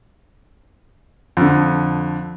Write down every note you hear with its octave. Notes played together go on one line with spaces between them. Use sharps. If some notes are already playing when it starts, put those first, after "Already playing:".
F2 D3